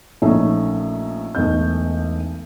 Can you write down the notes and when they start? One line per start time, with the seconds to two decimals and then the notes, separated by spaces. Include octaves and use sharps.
0.22 A#1 A3 C#4 D#4 E5
1.35 E1 B1 A3 D#5 G6